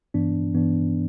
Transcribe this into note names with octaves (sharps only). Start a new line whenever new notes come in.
G2 E3 B3 D4
G2 E3 B3 D4